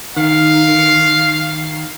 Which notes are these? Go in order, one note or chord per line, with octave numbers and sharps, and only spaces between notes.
D#3 F5